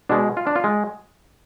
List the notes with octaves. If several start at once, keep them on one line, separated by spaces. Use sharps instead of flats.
B2 G#3 D4
F4
D4
F4
G#3